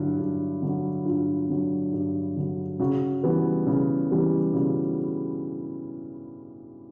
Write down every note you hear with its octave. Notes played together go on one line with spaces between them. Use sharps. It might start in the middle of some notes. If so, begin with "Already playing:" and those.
Already playing: G2 D3 F#3 E4
G2
D3 F#3
G2 F4
D3 F#3
G2
D3 F#3
C#3 F#4
E3 G3 B3
C#3
E3 G3 B3
C#3 F#4